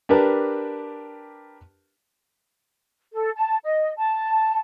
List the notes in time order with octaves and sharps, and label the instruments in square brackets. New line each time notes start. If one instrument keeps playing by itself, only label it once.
[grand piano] D4 G4 A#4 B4 A5
[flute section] A4
A5
D#5
A5